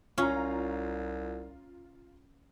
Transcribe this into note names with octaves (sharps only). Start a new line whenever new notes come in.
C2 C#4 F4 A#5